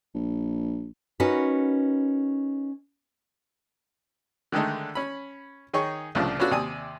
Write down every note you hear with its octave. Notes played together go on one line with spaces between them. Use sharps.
A#1
C#4 D#4 F#4 A#4 B4
D3 D#3 G#3 A3 D#4
C#4 B5
D#3 D#4 G#4 C#5 C#6
C2 A2 C#3 F3 D4
B3 C#4 D4 F4 F#4 A4
D#2 C3 D5 G#5 D#6